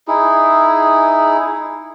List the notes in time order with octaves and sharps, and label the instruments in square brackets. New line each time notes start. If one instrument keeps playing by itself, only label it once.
[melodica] D#4 E4 G#4